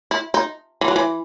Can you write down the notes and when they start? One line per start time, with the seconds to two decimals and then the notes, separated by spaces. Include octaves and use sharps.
0.11 E4
0.34 D#4
0.81 E3
0.88 F#3
0.96 E3